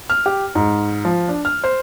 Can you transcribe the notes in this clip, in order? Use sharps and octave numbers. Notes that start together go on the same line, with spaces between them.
F6
G4
G#2
F3
D4
F6
C5